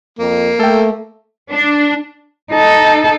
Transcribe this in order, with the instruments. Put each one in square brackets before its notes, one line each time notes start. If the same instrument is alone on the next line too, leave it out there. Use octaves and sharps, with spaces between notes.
[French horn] F2 [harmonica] A#3
[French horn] A3 [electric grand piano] A4 G5
[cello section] D4
[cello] D#4 A4